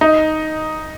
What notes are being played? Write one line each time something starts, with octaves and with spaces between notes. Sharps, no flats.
D#4